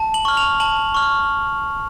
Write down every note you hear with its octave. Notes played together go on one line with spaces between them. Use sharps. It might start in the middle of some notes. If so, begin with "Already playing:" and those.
Already playing: A5
F#7
C#6 F6
F7
A5 F#7
C#6 F6